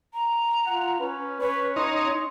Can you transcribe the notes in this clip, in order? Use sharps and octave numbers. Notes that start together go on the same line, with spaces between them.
A#5
F4 F#5
C#4 B4
C#4 B4 C#5
D#4 C#5 C6